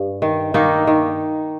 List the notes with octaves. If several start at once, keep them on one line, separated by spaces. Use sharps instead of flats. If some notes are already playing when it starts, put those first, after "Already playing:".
Already playing: G2
D#3
D#3 A#3 D#4
D#3